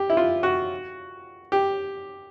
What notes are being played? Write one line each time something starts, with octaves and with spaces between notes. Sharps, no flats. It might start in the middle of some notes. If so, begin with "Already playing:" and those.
Already playing: G4
E4
F4
F#4
G4